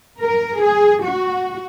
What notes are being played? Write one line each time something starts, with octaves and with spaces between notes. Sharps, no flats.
A#4
G#4
F#4